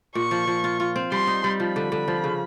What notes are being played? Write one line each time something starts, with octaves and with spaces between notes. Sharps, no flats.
A#2 C#6
F3
F3
F4
F4
C4
G3 C6
D#4
G3
F3 B5
D3
D3
F3
C#3